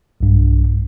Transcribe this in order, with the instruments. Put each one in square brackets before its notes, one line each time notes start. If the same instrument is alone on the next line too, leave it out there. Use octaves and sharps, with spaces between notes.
[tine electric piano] B1 G2